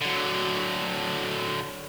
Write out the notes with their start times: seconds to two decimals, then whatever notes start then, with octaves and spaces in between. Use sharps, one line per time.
0.01 D3 F#3